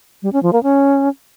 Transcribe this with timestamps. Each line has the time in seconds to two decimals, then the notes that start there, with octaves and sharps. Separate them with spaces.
0.23 G3
0.33 C#4
0.43 F3
0.53 A#3
0.63 C#4